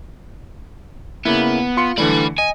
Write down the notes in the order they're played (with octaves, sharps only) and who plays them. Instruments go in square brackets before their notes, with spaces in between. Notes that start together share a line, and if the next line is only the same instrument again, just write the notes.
[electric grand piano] C#3 A#3 E4 [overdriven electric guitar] B3
[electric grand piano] F4 C6 C#7
[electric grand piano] D3 E3 A3 [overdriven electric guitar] D5 B5
[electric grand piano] D#5 [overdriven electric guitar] G#5